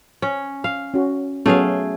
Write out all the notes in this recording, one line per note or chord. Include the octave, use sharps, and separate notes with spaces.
C#4
F5
C#4 F#4
F#3 A3 B3 C#4 G#4 F5